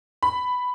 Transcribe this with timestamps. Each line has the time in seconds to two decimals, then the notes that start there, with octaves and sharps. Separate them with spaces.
0.23 B5